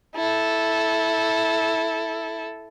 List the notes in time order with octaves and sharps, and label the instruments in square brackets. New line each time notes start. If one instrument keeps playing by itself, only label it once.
[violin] E4 A4